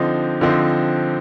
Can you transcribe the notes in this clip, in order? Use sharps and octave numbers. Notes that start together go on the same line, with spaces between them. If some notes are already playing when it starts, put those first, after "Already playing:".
Already playing: D3 F3 C4 D#4
D3 F3 C4 D#4